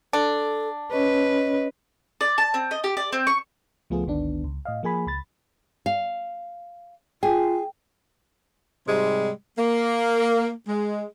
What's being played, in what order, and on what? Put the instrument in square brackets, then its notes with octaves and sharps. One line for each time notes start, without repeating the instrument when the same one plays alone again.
[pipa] D4 [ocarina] A4
[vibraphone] C#4 C#5 [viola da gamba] B4 [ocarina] D#5
[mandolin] D5
A5
C4
D#5
G4
D5
C4
C#6
[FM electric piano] C#2 F3 A3 B3 F4 G#4
G#1 D2 D#3 B3 D4
C#2
A2 D#5 F5
F3 A#3 G#4 G#5 B5
C#2 B5 A6
[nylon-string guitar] F5
[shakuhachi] F4 [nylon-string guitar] G#4 [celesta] G5
[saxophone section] G#2 C3 G3 G#3
A#3
G#3